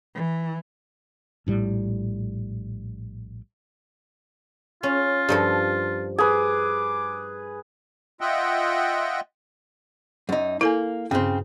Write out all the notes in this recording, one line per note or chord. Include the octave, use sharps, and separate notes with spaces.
E3
A#1 A2 G3
C#4 F4
G2 F3 A4
G#4 B4 D6
F4 D#5 E5 F#5 G5
F#2 D#4
A#3 E4 A4 G#5
G2 C#3 C4